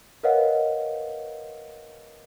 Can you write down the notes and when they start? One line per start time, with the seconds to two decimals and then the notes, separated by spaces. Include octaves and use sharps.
0.23 A#4 B4 C#5 D#5 F5 F#5